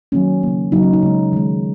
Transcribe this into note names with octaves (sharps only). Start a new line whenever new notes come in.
D#3 F#3 A#3 C#4
C#3 A#3
C#3 F#3 A#3 D#4
C#4
D#4
C#3 G#3
D#3 G#3